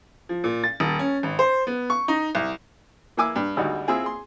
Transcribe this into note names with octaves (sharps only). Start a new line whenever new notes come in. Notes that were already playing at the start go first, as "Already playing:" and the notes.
F3
A#2
A6
D#1
C#4
G#1
C5
B3
C#6
D#4
C2
A#3 E4 G#5 D6 E6
G2
G#1 D2 G3 D#4 F#4
C4 E4 F4 G#4
G#4 C6